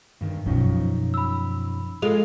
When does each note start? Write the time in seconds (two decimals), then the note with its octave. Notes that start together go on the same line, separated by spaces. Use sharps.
0.21 G2 D#3
0.46 F#2 B2 F3 C#4 D#4
1.14 B5 E6
2.02 G#3 F4 A4 F7